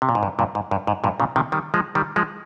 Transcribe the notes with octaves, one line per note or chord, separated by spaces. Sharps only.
C3
A#2
G#2
G2
G2 A#2
G#2
G2
G#2
G2 A#2
A#2 C#3
C3 D#3
D#3 G3
F3 G#3
D#3 G3
F3 G#3